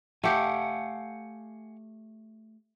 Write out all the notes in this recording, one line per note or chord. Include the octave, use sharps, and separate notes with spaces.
A3 G4 F5 F#5 G#5